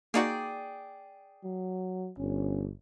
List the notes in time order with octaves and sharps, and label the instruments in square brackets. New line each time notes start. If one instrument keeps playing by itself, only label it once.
[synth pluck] A#3 D#4 F#4 [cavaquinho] G#4 D5 G5
[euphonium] F#3
[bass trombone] G1 [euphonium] C#4